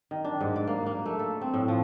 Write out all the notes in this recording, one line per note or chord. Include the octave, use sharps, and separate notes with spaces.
D#3
D4
G#2
D5
A#3
A#3
A3
A4
C4
A2
F3